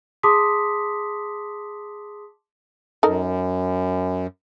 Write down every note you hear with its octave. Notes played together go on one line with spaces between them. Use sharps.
G#4 A5 C6 D6 D#6 B6
F#2 D#4 A4 A#4